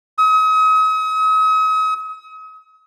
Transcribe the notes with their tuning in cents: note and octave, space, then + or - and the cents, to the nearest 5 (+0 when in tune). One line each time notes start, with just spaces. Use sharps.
D#6 +40